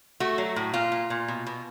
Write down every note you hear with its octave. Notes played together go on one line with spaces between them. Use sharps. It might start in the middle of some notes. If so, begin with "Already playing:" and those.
A3 F#4
F#3
A2
A#2 F4
A#2
A#2
B2
B2